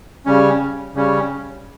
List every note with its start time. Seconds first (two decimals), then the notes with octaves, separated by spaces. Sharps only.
0.26 C#3 G3 C#4
0.95 C#3 G3 C#4